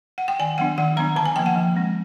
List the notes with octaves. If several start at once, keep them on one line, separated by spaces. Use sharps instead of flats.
F#5
G5
D#3 G#5
F#3 B3 D4 F#5
D#3 F#5
F#3 B3 D4 A#5
D3 A5
G#5
F3 A#3 G5
F#5
F3
G#3 C4